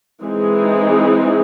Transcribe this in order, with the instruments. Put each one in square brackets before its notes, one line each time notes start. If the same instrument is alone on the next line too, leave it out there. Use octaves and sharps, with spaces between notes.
[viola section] E3 G#3 C4 D#4 G#4